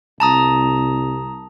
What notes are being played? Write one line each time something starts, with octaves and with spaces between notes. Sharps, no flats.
C2 A5 A#5 D#6